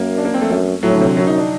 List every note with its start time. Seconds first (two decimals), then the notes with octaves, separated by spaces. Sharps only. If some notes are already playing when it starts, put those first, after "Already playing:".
Already playing: F#2 A#3
0.18 D4
0.25 A#3
0.34 C4
0.41 A3
0.50 F#2
0.83 A2 F#3
0.92 D3
1.00 C3
1.08 D3
1.16 F#2 F#3
1.27 D#4
1.38 D4